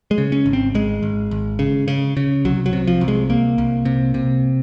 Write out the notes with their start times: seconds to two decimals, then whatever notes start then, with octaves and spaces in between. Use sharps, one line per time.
0.11 G#3
0.18 C#3
0.32 C#4
0.46 G#1
0.53 C4
0.75 G#1 G#3
1.03 G#1
1.31 G#1
1.59 C#3
1.88 C#3
2.17 C#3
2.45 C2 F#3
2.66 F#3
2.73 C3
2.87 F3
3.01 C2
3.08 G#3
3.29 C2 A#3
3.58 C2
3.85 C3
4.14 C3